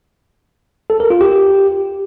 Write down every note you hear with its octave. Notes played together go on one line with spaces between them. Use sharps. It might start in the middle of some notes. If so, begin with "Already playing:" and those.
A4
A#4
F4
G4